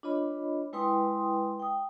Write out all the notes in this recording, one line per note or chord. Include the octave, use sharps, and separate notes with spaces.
D4 F4 C#5 D#5 B5
G#3 E4 B4 G5 C6 D#6
G5 D#6